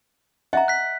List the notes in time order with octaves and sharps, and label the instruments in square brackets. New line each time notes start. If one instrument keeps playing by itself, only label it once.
[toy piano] D#5 E5 A#5 [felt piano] F#5
[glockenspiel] F#6 B6